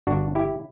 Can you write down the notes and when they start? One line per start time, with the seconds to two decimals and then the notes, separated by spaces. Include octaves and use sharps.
0.07 G1 D4 F#4
0.35 E4 G4